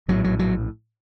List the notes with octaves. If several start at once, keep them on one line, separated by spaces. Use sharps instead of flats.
A#1 A2 F#3
F#3
F#3